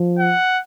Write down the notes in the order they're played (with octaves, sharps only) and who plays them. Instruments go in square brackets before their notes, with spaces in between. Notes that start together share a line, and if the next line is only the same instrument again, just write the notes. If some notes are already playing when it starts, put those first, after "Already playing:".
Already playing: [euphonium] F3
[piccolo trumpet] F#5